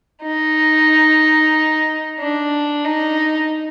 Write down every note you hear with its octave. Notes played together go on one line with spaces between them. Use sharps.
D#4
D4
D#4